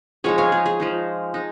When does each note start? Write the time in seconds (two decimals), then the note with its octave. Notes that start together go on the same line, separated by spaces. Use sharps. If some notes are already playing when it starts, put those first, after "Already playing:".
0.24 F3 G#3 D#4 G#4 C#5
0.38 C#5 F5
0.52 G#4
0.66 G#4
0.80 F3 G#3 D#4
1.34 G#3 D#4